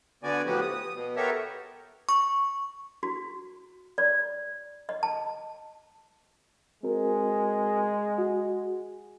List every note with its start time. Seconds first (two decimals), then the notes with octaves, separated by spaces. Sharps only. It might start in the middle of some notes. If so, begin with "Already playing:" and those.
0.23 D3 B3 F#4 D5 G#5
0.46 A2 F3 F#3 B3 F#4 G4
0.61 D#6
0.94 B2
1.16 B3 G4 A4 A#4 C#5 E5
2.09 C#6
3.03 F#4
3.98 D5
4.89 D#5
5.03 A5
6.83 G#3 C4 F#4 A#4
8.18 F#4